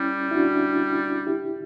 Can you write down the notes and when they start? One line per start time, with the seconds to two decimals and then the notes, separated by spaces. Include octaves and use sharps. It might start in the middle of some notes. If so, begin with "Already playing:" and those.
Already playing: G3 C#4 E4
0.31 E4
0.35 D4 F#4
1.27 E4 G4